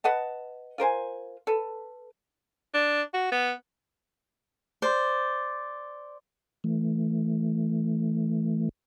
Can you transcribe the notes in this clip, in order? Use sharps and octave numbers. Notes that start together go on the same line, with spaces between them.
B4 D#5 F#5 A5
F4 A#4 C5 G#5
A4 B4
D4
F#4
B3
C5 D5
E3 A3